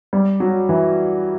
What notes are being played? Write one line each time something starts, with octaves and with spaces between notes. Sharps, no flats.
G3
F#3
E3